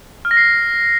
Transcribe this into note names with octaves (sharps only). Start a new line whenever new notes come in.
F6
A#6
C7